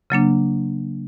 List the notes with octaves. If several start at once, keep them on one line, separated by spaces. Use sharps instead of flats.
C#3 F#3 A#3 D4